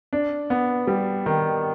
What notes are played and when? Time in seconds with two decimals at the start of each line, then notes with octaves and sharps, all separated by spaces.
0.13 D4
0.50 B3
0.87 G3
1.26 D#3